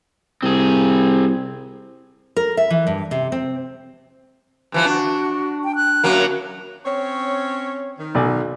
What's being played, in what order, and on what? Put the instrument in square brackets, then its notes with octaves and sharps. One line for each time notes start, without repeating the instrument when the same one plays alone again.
[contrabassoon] C2 [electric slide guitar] C4 G#4
[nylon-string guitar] A#4
E5
E3
G2
C3
C4
[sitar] G2 E3 F3
[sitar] D4 [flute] F#4
[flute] G5
F#6
[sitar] F#2 F#3 A#3
[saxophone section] C4 C#4 C#5
D#3
[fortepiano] B1 D5 G#5